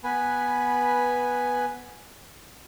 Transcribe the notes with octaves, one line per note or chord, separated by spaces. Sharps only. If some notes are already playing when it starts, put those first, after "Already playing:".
B3 B4 G#5 B5